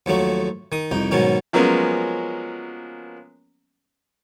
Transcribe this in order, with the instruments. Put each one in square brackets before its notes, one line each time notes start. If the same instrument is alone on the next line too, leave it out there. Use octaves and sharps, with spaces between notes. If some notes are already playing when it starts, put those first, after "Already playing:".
[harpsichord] D#2 F3 F#3 A3
D#3 D#6
C2 F2 D#4
G#2 B2 D#3 F#3 C#4
[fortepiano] F3 F#3 G#3 A#3 B3 C#4